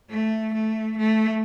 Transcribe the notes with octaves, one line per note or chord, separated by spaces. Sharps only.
A3
A3
A3